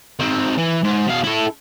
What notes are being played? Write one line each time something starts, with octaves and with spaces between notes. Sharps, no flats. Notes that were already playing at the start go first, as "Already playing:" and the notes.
D#3 C4
E3
G#2
B2 F5
E4 A4